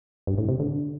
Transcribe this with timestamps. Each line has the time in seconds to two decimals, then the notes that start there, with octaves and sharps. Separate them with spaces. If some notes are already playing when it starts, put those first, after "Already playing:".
0.27 G2
0.38 A2
0.49 C3
0.59 D3